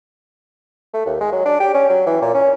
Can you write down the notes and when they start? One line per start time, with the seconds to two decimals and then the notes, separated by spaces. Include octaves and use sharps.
0.94 A3
1.06 D#2
1.21 G#3
1.32 F#3
1.45 D4
1.60 G4
1.74 C#4
1.89 F#3
2.06 E3
2.22 A#2
2.34 C#4